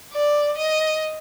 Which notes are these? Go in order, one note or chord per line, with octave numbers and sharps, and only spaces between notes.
D5
D#5